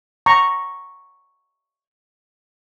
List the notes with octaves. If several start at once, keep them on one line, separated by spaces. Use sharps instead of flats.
A#5 C#6